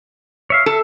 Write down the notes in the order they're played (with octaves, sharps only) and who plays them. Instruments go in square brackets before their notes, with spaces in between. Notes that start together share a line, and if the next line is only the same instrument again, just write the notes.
[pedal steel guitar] C#5 E5 F5
[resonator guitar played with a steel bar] A4 [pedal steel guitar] E5